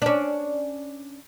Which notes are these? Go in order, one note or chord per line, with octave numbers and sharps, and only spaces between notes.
C#4 D4